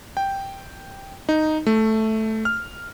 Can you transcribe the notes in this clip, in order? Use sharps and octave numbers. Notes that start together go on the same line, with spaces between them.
G5
D#4
A3
F6